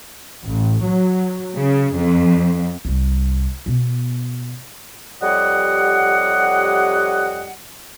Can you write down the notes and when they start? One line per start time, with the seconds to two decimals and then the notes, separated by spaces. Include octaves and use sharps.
0.45 A1
0.84 F#3
1.55 C#3
1.95 F2
2.85 C2 G3
3.66 B2 B3
5.22 F2 G3 G4 C#5 D#5 F#5